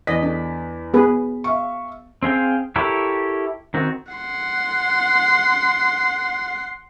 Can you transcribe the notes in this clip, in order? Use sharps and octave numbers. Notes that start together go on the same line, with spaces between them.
E2 D5 D#5 B6
D4
B3 G#4 B4
E5 F5 C#6
C4 G#4 F5 G5
E4 G4 A4 A#4 C#5
D#3 C4 F#4
F#5 C6